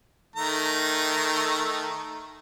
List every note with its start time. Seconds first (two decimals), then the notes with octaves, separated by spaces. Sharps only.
0.36 D#3 A3 A#5